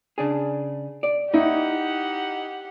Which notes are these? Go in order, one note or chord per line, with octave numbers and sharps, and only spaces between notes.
C#3 D4 G#4
D5
D#4 E4 G4 F#5